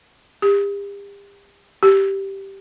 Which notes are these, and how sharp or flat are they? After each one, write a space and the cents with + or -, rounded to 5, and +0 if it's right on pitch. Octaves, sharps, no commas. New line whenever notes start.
G4 +40
G4 -5